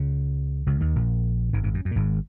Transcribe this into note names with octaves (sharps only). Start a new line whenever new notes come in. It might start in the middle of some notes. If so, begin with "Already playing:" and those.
Already playing: C#2 C#3
C#2 C#3
D#2 D#3
A#1 A#2
G#1 G#2
G#1 G#2
F#2
F#2
A#2
G#1 G#2